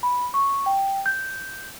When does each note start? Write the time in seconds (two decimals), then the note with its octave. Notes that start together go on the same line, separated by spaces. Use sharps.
0.03 B5
0.34 C#6
0.66 G5
1.06 G6